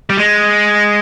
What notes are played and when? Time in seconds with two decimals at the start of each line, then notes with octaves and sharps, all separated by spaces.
0.10 G3
0.17 G#3